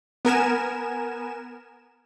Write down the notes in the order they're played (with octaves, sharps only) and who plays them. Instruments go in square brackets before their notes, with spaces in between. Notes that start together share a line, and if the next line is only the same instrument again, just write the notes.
[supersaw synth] B3 A#4 G#5 E7